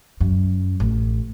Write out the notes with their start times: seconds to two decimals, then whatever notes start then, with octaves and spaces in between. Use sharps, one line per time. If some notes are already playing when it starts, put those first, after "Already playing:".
0.21 F#2
0.80 A1